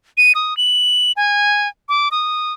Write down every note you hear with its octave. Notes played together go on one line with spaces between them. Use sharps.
D#7
D#6
F#7
G#5
D6
D#6